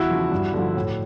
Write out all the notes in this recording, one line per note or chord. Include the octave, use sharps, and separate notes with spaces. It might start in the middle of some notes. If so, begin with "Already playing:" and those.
Already playing: E2 E4 F#4
C#3 F3
G2
D3 F3
A2